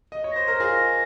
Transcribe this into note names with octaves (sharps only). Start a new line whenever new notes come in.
D#5
C#5
C5 A#6
A#4
F4 G#4 A#6